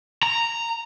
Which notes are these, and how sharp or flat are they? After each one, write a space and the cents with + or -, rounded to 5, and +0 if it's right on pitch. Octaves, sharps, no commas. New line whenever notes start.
A#5 -10